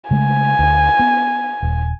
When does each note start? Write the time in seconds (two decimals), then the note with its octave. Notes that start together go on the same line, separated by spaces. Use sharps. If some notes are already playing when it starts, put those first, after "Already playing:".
0.11 C#3 G#3 A3 G#5
0.59 D2
0.99 B3
1.62 D#1